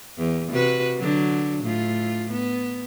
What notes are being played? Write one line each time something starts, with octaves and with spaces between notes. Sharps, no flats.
E2
C3 F#4 B4
D3 F#3
A2 F4
B3